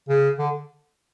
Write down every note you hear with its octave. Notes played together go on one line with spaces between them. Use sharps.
C#3
D3